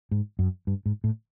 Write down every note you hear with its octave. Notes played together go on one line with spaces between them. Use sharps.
G#2
F#2
G2
G#2
A2